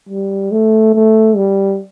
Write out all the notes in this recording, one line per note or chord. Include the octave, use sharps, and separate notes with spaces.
G3
A3
A3
G3